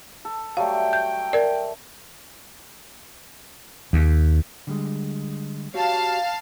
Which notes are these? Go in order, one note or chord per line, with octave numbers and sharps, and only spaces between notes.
A4
F#3 G3 A3 F5 G5
G6
A#4 D5
D#2
D3 G3 G#3
F#4 G4 C#5 F5 A5